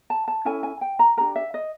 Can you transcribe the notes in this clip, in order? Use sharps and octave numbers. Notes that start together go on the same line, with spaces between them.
A5
A5
C#4 E4 A4 G#5
G#5
G5
A#5
D4 G4 A#4 A#5
E5
D#5